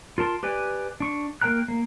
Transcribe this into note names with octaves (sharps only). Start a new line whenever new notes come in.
F4 A#4 A5 C6
G4 B4 D5 G#5
D4 C#6
A#3 A#4 G5 A#5 F#6
A#3